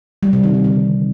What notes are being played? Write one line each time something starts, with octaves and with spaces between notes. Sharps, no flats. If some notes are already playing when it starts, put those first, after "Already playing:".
G3
C3
D#3
D#3
D3